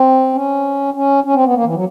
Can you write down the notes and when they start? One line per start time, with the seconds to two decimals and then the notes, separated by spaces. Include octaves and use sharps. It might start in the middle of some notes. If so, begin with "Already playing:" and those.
Already playing: C4
0.33 C#4
0.94 C#4
1.24 C#4
1.34 C4
1.44 B3
1.54 A#3
1.64 E3
1.74 F#3